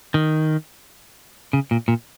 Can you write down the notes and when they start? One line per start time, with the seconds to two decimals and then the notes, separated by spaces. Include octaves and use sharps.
0.14 D#3
1.53 C#3
1.71 A#2
1.88 A#2